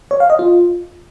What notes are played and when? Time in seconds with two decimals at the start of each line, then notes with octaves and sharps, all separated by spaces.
0.11 C#5
0.20 F5
0.30 D#5
0.39 F4